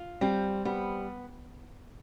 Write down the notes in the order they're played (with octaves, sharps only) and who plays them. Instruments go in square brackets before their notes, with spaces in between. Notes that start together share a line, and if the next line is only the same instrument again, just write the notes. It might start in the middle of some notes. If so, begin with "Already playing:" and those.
Already playing: [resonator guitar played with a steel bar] F4
[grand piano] G3 [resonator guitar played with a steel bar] C4
[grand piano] G3 [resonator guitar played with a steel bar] B3